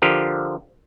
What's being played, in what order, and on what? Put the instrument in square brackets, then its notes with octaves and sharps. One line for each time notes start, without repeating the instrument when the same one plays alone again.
[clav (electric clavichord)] D3 F3 G4 A#4